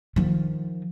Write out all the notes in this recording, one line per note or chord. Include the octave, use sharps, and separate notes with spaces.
D#3 F3